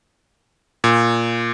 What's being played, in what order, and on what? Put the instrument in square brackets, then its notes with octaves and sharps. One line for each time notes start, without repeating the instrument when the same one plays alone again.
[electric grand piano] A#2